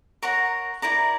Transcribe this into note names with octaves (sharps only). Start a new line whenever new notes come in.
A#4 C#5 F#5 A#5
E4 A#4 D5 A#5